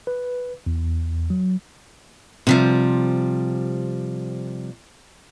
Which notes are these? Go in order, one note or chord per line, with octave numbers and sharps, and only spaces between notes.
B4
E2
F#3
C3 F3 G3